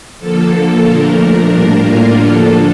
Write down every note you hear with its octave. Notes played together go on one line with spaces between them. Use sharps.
D3 F3 A#3 A4
A#2 F3 A3 D4 A#4
A2 G3 A#3 D4 A#4
F4
D3 F3 A#3 D4 A4